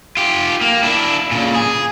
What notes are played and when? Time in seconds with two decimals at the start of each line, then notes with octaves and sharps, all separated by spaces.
0.17 F4 G4
0.61 A#3
0.83 D4 E4
1.31 A#2 C#3
1.54 G#4